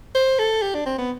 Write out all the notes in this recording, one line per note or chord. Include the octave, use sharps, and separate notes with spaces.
C5
A4
G4
D4
C4
B3